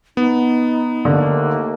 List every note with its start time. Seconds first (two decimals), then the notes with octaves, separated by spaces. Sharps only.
0.17 B3 D#4
1.05 D#2 D3 A3 A#3